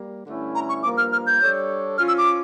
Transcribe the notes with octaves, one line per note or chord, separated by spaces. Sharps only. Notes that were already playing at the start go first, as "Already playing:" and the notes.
Already playing: G3 A#3
G2 D3 A3 C#4 E4
A#5
C#6
G2 F3 A#3 D6
F6
F6
G6
G3 D4 A4 C#5
F3 C#4 F4 F6
E6
D6